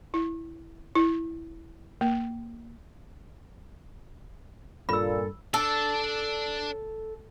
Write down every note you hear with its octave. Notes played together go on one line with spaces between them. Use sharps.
E4
E4
A#3
G2 A#2 A4 B5 E6
D4 A4 D5